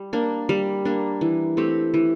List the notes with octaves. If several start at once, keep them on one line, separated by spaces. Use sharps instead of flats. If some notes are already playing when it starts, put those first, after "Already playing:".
Already playing: G3
A#3 D4
G3
A#3 D4
E3
A3 C4 G4
E3